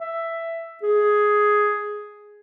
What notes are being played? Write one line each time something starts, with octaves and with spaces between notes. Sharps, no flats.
E5
G#4